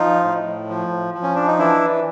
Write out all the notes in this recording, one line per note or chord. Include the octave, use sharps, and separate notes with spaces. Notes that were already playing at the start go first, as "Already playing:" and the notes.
Already playing: F3 D#4 F4
A2
F3
F3
C#4
D4
D#4
E3 D4 E4